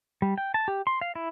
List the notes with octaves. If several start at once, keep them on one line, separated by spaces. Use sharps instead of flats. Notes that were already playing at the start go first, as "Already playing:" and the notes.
G3
G5
A5
G4
C6
F5
E4